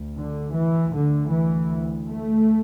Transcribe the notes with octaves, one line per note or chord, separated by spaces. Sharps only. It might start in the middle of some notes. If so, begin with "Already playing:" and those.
Already playing: D2
D3
E3
D2 D3
E3
A3